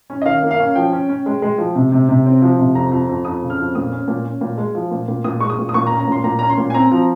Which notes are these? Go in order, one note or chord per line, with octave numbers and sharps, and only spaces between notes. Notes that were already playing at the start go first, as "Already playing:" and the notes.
C#4
D#5
D#3 F5
A#3
F5
C#4
F3 G5
C#4
C#4
G#3
G#3
F3
C3
C3
C3
C4
F3
C3
F2 A#5
F2
F2
F2 D#6
C#3
F6
F2
A#2 D#6
C#4
A#2
C#4
A#2
G#3
F3
A#2
A#2
A#2 D#6
G#3 C#6
D#6
A#2
D#6
A#2 C#6
A#5
C#4
A#5
A#2 C6
A#2 A#5
C#4 A#5
C6
A#2
G#5
C4 A#5
F3